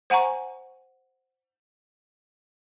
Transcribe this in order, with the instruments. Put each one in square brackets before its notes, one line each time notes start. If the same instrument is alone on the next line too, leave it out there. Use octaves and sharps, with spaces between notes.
[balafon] C5 F#5 G#5 A#5 C#6